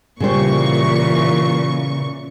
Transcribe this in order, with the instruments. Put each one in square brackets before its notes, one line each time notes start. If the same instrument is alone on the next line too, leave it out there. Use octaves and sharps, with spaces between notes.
[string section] A#2 E3 C#6 [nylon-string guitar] C#3 G3 C5